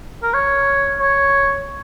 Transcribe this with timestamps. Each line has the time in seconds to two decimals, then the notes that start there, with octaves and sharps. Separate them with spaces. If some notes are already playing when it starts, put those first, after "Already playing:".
0.23 A#4
0.34 C#5
1.00 C#5